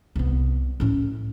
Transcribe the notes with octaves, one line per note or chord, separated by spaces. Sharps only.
C2 B3
A2 C#4